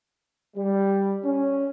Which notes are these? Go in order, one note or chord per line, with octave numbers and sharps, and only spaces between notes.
G3
C#4